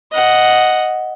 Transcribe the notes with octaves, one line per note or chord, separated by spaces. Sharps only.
D#5 F#5